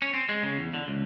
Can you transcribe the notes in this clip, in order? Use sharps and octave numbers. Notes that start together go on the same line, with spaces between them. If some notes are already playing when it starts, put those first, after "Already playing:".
C#4
C4
G#3
C#3
E2
D3
C#2